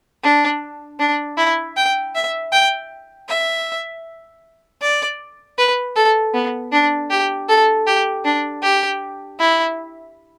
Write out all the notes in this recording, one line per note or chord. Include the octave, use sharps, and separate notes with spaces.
D4
D4
E4
G5
E5
G5
E5
D5
B4
A4
B3
D4
G4
A4
G4
D4
G4
E4